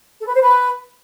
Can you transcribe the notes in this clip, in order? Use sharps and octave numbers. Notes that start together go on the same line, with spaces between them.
A4
B4
C5
B4